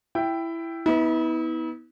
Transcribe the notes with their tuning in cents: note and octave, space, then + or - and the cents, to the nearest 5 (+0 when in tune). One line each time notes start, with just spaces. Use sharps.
E4 +10 G5 +0
B3 +0 E4 -40